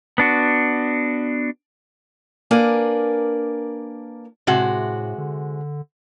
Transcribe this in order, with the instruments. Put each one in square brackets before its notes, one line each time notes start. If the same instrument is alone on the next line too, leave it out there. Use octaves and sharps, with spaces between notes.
[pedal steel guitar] B3 D4 F#4
[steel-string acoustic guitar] A#3 D4 A#4 B4 G#5
[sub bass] A2 [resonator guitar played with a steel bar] C3 G#3 F#4
[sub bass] D3